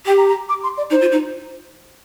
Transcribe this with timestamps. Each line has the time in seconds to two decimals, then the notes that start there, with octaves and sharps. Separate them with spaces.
0.06 G4 G5
0.17 A#5
0.28 A#5
0.48 D6
0.63 C6
0.77 D5
0.90 D#4 C5
1.01 F4
1.12 D#4